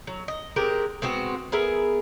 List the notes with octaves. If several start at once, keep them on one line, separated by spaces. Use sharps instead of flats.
F#3
D#5
G#3 C4 G4 A#4
G#3 B3 C4 F#4
B3 G#4 A#4 E5